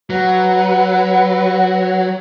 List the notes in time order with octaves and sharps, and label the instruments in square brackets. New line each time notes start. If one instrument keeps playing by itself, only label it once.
[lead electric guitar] F#3 [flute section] B4 F#5